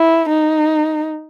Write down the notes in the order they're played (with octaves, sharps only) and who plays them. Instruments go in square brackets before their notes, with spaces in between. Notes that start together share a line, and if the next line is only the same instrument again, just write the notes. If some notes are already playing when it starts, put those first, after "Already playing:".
Already playing: [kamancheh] E4
D#4